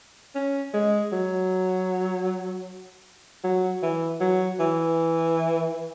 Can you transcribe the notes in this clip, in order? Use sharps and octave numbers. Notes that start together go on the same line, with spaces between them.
C#4
G#3
F#3
F#3
E3
F#3
E3